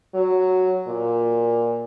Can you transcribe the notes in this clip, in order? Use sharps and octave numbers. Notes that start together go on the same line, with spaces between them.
F#3
A#2